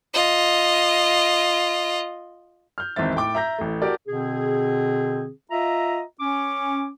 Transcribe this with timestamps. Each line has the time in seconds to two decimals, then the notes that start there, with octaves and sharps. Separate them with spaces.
0.14 F4 D#5
2.78 F6 G6
2.96 G#1 E2 C4 E5 A6
3.16 A2 G5 D6
3.35 E5 A#5 G6 A#6
3.58 A1 A3
3.82 F#4 G4 A4 A#4 D5
4.08 B2 D3 C4 G#4
5.51 F4 D#5 E5 A#5
6.20 C#4 D6